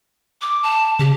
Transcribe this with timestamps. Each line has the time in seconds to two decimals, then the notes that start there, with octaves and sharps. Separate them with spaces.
0.41 D6
0.63 A5
0.99 C#3 G4